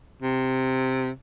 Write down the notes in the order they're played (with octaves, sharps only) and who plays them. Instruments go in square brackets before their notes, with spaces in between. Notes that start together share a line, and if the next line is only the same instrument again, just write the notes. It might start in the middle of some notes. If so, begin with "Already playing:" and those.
[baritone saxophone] C3